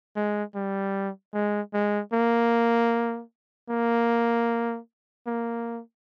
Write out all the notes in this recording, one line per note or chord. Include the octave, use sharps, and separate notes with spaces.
G#3
G3
G#3
G#3
A#3
A#3
A#3